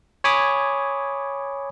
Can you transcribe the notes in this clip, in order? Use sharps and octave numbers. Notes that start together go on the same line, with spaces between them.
C#5 G#5 B5 D6 D#6